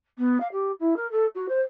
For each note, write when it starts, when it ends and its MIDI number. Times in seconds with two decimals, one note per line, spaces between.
0.18 0.38 59
0.40 0.48 77
0.52 0.72 67
0.80 0.95 64
0.97 1.10 70
1.11 1.26 69
1.35 1.47 66
1.49 1.62 72